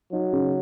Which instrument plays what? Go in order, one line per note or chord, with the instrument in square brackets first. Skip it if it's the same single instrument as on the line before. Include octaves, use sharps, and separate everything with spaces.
[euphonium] F#3 [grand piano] D#4
[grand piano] C#3